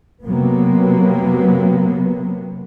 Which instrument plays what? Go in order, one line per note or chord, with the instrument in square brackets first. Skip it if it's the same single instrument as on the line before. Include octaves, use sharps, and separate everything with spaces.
[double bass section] C3 F#3 A#3 B3